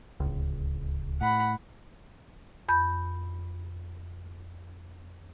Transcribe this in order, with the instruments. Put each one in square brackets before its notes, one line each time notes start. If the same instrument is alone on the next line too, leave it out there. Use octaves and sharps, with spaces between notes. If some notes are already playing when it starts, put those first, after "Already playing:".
[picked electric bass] D1 C#2
[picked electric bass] A2 [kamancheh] F#5 B5
[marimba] F2 B5 G6